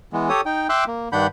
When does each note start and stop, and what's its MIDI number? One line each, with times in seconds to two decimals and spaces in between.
0.13 0.29 52
0.13 0.29 56
0.13 0.29 59
0.29 0.41 67
0.29 0.41 69
0.29 0.41 73
0.29 0.41 87
0.46 0.67 63
0.46 0.67 79
0.69 0.84 76
0.69 0.84 79
0.69 0.84 84
0.69 0.84 86
0.69 0.84 88
0.69 0.84 90
0.87 1.09 58
1.12 1.27 43
1.12 1.27 51
1.12 1.27 62
1.12 1.27 78
1.12 1.27 83
1.12 1.27 91